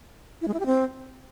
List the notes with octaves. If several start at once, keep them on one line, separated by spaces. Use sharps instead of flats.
E4
G#3
E4
G4
C4